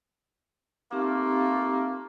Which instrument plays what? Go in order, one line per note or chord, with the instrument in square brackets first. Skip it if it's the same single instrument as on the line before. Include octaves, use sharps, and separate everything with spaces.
[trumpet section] A3 A#3 F4 [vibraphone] C4 D#4 G4